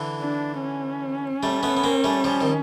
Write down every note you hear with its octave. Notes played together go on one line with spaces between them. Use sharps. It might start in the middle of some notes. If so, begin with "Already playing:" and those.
Already playing: D3 E3
D4
C#4
G3 A3
A3 B3
B3
A#3 C4
G3 A3
F3 G3
D#3